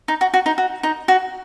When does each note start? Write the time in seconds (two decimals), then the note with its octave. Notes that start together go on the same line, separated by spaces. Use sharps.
0.08 D#4
0.21 F#4
0.34 F#4
0.46 D#4
0.58 F#4
0.83 D#4
1.08 F#4